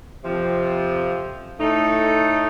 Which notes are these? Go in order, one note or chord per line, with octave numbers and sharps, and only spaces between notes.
F2 C3 F3
A2 A3 D#4 A4